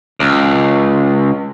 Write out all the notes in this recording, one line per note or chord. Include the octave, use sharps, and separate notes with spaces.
C#2